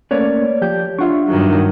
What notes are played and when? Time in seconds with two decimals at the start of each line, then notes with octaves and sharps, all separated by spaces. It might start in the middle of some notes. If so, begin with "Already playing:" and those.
0.11 A3 A#3 C#4 B4 C#5 D5
0.62 F3 G4 G6
0.99 D4 F4 E5 F#5 C#6
1.28 G2 D#3 F#3